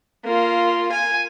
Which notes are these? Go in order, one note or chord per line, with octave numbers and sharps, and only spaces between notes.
A#3 F4
G#5